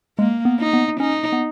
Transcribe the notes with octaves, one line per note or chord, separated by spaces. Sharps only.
G#3 A#3
B3
D#4
B3
C#4 D#4
B3